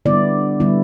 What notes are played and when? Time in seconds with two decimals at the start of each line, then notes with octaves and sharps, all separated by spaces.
0.05 D3 G3 B3 E4 D5
0.60 D3 G3 B3 E4